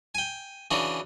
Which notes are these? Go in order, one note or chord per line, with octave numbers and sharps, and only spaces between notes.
G5 G#5
C#3 E3 D4 F#4